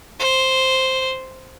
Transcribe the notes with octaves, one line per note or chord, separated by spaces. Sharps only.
C5